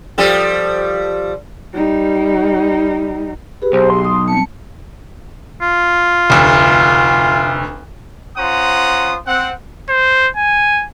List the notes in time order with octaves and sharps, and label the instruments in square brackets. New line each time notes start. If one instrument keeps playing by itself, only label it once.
[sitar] F3 G3 A4
[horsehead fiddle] G3 D#4
[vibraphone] G4 G#4 [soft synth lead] B4
[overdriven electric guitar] B1 [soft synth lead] C5
[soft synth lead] C6
[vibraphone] D#6
[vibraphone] G3 C4 A5 [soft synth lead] C#7
[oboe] F4
[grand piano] F1 D2
[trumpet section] C#4 F4 C5 F#5 A#5 D#6
C4 F#5
[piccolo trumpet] C5
G#5